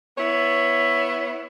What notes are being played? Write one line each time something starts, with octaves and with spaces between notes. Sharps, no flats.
B3 E4 C#5